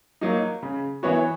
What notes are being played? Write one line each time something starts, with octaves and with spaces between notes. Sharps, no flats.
F#3 A#3 D#4
C#3
E3 B3 F#4 C#5